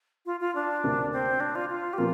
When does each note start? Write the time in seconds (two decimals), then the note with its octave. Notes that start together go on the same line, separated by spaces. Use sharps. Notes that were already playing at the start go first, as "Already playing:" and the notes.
0.26 F4
0.40 F4
0.55 D4
0.83 D2 C3 A#3
1.12 C4
1.40 D4
1.55 F4
1.69 F4
1.93 G4
1.98 A#2 F3 C4 F4 A#4